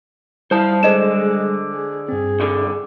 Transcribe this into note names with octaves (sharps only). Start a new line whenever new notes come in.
G3 E4 C5 F5 A5
D3 G#3 C5 D#5 E7
G#4
G2 C4 G#4
C2 D3